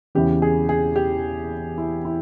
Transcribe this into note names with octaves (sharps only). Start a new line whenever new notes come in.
E2 C#3 E3 G4
G#4
G#4
G4
E4
E4